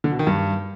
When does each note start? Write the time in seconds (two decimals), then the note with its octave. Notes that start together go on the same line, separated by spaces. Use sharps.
0.04 D3
0.12 B2
0.19 D#3
0.27 G2